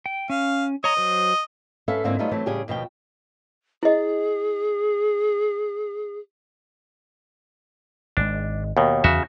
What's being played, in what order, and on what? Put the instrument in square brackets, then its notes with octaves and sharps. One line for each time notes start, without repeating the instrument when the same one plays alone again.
[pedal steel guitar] G5
[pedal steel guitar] C#4 [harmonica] F5
[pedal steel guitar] C#5 A#5 [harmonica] D#5
[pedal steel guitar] F#3 C5
[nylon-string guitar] G#2 C#4 A4 B4 E5 F5
G#2 D3 A#3 C4 C#4 E4
F#3 G3 A3 B3 D#4 F4
E3 F#3 A3 C4
A2 C#3 G3 G4 G#4
D#2 B2 F3 G5
[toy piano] E4 D#5 [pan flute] G#4
[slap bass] G#1 G#3 [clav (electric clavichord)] D4
[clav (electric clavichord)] D#2 B2
[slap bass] E2 [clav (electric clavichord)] C#3 F#4 E5